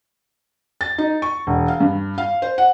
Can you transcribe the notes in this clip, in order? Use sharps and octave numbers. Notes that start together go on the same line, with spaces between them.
A6
D#4
C#6
E1
F5
G2
F5
C5
F#5